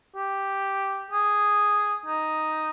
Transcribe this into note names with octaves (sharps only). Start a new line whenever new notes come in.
G4
G#4
D#4